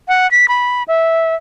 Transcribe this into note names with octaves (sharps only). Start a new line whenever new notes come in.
F#5
B6
B5
E5